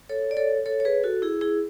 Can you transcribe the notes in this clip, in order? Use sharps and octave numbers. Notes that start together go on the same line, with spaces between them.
A4 C#5
D5
A4 C#5
A4 C#5
C#5
G#4 B4
F#4 A4
E4 G#4
E4 G#4